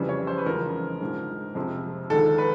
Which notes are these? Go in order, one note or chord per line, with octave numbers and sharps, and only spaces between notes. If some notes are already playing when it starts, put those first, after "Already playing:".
Already playing: F2 C#3 E3 G3
C#5
C5
B4
F1 E2 C#3 F3 G#3 A#4
A#1 G#2 F3 G#3
F2 C3 F3 G#3
D#2 D3 F3 G#3 A4
B4